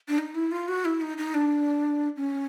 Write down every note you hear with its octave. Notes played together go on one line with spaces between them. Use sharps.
D4
D#4
E4
F4
F#4
E4
D#4
D#4
D4
C#4